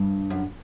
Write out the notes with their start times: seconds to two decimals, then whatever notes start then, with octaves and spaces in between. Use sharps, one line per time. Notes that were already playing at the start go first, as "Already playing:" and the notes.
Already playing: G2
0.30 F#2